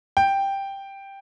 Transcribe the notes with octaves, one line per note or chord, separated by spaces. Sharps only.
G5